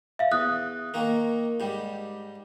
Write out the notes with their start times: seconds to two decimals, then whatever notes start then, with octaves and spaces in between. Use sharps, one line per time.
0.19 E5 F5
0.32 E2 D#6 F#6
0.94 D#3 A#3
1.60 G#2 G3